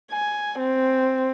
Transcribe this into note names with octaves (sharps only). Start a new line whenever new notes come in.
G#5
C4